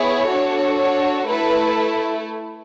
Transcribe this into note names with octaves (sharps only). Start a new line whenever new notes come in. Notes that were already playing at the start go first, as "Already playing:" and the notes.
Already playing: B3 E4 G#4 C#5
D4 F#4 A4
C#5
A3 E4 A4 B4